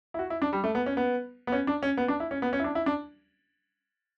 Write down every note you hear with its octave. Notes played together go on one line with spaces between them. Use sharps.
E4
F#4
E4
D4
G3
A3
B3
C#4
B3
B3
C#4
D4
C#4
B3
D4
E4
C#4
B3
C#4
E4
D4
E4
D4